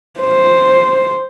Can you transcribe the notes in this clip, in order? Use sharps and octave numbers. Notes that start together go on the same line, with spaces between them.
C5